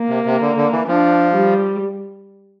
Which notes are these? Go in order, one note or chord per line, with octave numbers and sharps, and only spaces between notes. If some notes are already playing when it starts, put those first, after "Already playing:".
Already playing: A#3
C3
C3
D3
D3
E3
F3 D4
G3